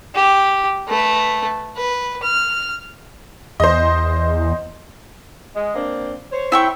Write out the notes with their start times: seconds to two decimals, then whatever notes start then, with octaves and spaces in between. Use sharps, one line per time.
0.15 G4
0.88 A3 B4
1.77 B4
2.22 F6
3.60 E2 C5 D#5
5.56 G#3
5.75 A#3 C4 D4
6.32 C5 C#5
6.52 E4 G5 C#6